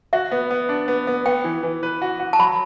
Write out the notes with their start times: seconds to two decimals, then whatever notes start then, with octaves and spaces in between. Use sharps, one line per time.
0.13 F#4 E5
0.31 B3
0.51 B3
0.69 D4
0.88 B3
1.07 B3
1.25 B3 G5
1.44 E3
1.63 E3
1.83 B4
2.02 F#4
2.20 F#4
2.33 A5
2.39 F#3 B5